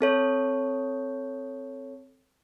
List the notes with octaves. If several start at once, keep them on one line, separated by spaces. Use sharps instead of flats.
C4 A4 C#5